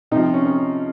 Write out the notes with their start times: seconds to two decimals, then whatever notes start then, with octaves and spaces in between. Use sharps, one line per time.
0.11 C3 C4 D#4
0.16 F3
0.23 C4
0.34 C#4
0.45 C#4